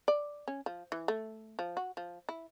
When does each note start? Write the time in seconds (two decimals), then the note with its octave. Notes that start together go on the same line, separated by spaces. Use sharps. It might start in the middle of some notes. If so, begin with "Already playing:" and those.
0.08 D5
0.48 C#4
0.66 F3
0.92 E3
1.08 A3
1.59 F3
1.77 F#4
1.97 F3
2.29 E4